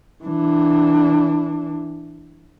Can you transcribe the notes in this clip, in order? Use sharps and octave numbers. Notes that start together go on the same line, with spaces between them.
E3 D4